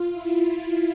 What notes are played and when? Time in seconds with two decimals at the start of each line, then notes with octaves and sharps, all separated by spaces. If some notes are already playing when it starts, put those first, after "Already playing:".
Already playing: F4
0.11 E4